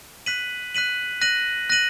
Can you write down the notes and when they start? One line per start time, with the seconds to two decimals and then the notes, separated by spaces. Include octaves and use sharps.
0.26 F#6 B6 D#7 F#7
0.75 F#6 B6 D#7 F#7
1.21 F#6 A#6 D#7 F#7
1.70 F#6 A#6 D#7 F#7